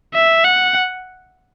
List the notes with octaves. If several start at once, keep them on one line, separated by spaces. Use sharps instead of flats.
E5
F#5